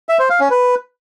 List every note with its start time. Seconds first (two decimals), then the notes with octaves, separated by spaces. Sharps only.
0.09 E5
0.19 C5
0.30 F5
0.40 C#4
0.51 B4